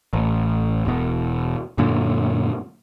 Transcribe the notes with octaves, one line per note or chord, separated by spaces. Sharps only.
A1
E1 B2
F#2 A#2 D3